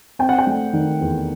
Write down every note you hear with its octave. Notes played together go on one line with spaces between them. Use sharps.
C4 G5
F#5
G5
A3
D#3
E2